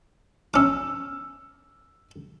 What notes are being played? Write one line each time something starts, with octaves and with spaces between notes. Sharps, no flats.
C#4 D6 E6 F6